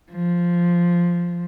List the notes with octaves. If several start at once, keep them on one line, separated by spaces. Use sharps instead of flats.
F3